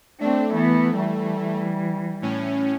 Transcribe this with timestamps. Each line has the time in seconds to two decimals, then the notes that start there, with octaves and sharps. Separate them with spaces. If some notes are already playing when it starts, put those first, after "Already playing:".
0.20 A3 C4 D4
0.54 E3 B3
0.95 E3 G3
2.22 A2 C#4